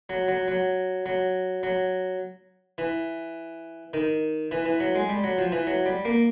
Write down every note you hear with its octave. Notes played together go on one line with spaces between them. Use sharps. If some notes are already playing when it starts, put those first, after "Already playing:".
F#3
F#3
F#3
F#3
F#3
E3
D#3
E3
E3
F#3
G#3
G3
F#3
F3
E3
F#3
G3
A#3